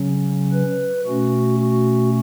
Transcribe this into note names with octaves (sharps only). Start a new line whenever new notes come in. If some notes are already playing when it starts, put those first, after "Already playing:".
Already playing: C#3 F#3 C#4
B4
B2 A3 C#4 F#4
F#4